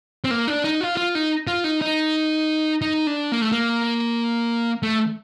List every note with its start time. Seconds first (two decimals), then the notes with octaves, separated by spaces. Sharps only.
0.24 C4
0.31 A#3
0.48 D4
0.64 D#4
0.81 F4
0.97 F4
1.15 D#4
1.47 F4
1.64 D#4
1.81 D#4
2.82 D#4
3.07 D4
3.32 A#3
3.42 A3
3.52 A#3
4.83 A3